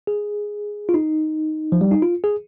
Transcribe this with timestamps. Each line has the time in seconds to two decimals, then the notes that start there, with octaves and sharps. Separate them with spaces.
0.07 G#4
0.89 F4
0.94 D#4
1.72 F3
1.81 G3
1.91 D#4
2.02 F4
2.24 G#4